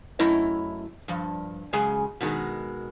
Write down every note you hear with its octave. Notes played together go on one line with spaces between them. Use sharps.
F#2 A3 E4 C#5 D#5
G2 F3
F#2 C#3 G#3 G#4 G#5
B2 D#3 F#3 G#3